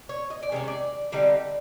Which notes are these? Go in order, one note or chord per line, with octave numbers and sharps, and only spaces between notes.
C#5
D#5
D5
C3 D#3 G#3 C#4 C#5
D5
D3 G3 C4 D#4